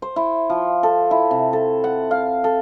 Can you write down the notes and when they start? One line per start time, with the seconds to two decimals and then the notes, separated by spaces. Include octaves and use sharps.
0.02 C5
0.16 E4
0.50 F3
0.83 A4
1.11 E4
1.31 C3
1.53 A4
1.84 F#5
2.11 F5
2.44 A4